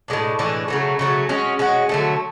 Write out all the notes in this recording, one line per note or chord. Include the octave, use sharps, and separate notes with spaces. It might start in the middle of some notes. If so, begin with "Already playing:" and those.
A2 E3 G#3 D4
A2 E3 G#3 D4
C#3 F#3 A3
C#3 F#3 A3
G#3 C#4 F#4
G#3 C#4 F#4
D3 F#3 A3